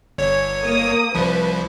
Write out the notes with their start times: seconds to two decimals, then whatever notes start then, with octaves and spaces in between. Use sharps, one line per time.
0.18 G1 C#5
0.64 A#3 D#6
1.15 C2 F3 B4